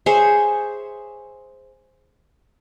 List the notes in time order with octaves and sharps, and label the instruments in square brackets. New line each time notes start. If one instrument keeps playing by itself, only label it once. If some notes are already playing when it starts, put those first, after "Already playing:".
[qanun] G#4 C5 C#5 E5